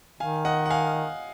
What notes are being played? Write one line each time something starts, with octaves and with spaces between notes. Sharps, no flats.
D#3 F5 G#5
D#5 F#5
F#5
F5 G#5